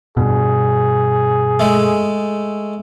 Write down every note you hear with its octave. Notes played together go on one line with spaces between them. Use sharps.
G2 B2 G#4
G#3 A3